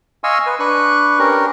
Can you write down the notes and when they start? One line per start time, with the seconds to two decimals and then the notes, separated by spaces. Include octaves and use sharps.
0.24 D#5 F5 G#5 C6 C#6 E6
0.46 B4
0.60 D4 B4 C#6 F#6
1.19 C#4 D4 G4 A#4